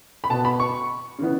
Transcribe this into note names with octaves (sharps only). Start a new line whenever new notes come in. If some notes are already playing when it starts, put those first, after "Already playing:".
B5
B2 B3 A5
B5
C#6
C#3 E3 B3